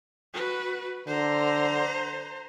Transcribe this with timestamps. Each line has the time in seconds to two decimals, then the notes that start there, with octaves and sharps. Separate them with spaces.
0.34 F#4 B4
1.07 D3 C5 A#5